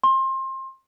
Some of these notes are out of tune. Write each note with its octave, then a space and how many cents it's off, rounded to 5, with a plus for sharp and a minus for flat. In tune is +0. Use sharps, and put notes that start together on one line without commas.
C6 +25